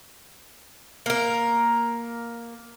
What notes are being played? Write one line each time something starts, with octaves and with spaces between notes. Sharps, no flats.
A#3 A#4